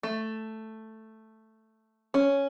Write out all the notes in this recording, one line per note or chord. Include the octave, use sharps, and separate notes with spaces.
A3
C#4